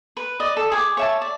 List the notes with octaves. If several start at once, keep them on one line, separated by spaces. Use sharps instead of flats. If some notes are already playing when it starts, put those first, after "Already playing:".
B4
D5 D#5
A4
G#4 D6
C#5 E5 A5
D5